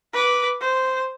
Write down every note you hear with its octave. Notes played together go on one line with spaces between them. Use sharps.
B4 D6
C5